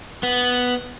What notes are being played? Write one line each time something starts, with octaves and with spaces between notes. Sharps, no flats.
B3